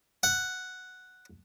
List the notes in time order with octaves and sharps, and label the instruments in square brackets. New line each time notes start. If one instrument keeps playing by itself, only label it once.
[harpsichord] F#5